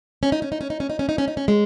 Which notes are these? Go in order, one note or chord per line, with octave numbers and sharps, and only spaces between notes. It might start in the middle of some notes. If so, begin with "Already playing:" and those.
C#4
D#4
C#4
D#4
C#4
D#4
C#4
D#4
C#4
D#4
C#4
D#4
C#4
G#3